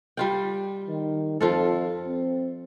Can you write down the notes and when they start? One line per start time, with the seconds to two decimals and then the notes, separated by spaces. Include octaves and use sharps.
0.17 G3 F4 G5
0.88 D#3
1.41 F2 F3 F4 A4
2.05 C4